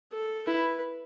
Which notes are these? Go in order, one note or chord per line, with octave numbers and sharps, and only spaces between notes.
A4
E4 B4